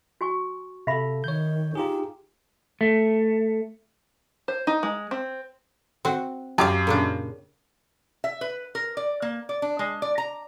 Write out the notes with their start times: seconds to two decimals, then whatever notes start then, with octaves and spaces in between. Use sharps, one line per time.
0.21 F#4 G#5 C#6
0.87 C3 A4 E5 F5 B5
1.24 D#3 C#5 G6
1.75 D#4 F4 G4 G#4
2.81 A3
4.48 C5
4.67 D#4
4.83 G#3
5.11 C4
6.05 C4 F#4
6.58 F#2 G4 D5 F5
6.87 A#2 C#3 D4
8.24 E5
8.41 B4
8.75 A#4
8.97 D5
9.22 A#3
9.49 D5
9.62 D4
9.79 G#3
10.02 D5
10.18 A#5